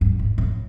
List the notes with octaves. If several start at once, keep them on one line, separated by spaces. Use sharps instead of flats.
G2
G#2
A2